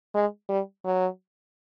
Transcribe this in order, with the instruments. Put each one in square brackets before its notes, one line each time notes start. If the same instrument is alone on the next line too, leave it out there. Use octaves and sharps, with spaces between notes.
[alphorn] G#3
G3
F#3